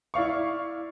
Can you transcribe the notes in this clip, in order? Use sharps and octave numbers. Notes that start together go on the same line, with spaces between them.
E4 D5 F5 C#6